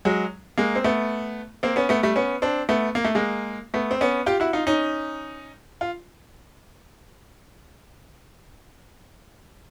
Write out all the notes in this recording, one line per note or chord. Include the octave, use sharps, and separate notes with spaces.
F#3 G#3
G#3 A#3
C4
A3 B3
A#3 C4
B3 C#4
A3 B3
G3 A3
B3 C#4
C4 D4
A3 B3
A#3
A3
G#3 A#3
A3 B3
C4
B3 C#4
F4 G4
E4 F#4
D#4 F4
C#4 D#4
F4